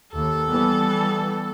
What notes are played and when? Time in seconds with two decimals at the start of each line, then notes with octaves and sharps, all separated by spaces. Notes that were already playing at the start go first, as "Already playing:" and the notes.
0.13 D#2 A4
0.48 E3 G3 B3